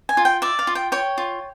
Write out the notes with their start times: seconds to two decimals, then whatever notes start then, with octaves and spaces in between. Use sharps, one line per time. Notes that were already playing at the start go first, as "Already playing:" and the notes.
0.09 G#5
0.17 F4
0.25 G5
0.42 D5 E5
0.59 F5
0.67 F4
0.75 G5
0.92 C#5 G5
1.18 F4